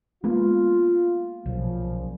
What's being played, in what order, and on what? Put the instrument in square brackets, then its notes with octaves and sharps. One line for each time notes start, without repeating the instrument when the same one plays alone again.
[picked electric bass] G#3 A#3 B3 [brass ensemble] F4
[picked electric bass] B1 [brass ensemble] A#2 C#3 F3